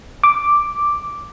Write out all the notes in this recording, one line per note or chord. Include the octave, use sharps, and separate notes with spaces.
D6